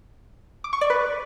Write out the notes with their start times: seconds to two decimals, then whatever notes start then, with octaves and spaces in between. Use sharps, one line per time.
0.64 D6
0.73 C#6
0.81 D5
0.90 B4